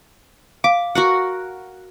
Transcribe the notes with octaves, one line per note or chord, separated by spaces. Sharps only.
F5 D6
F#4 A#4 F#5